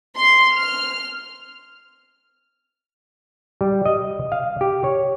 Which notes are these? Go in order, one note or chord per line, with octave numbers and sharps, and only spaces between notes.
C6
F6
G3
D#5
F5
G4
C#5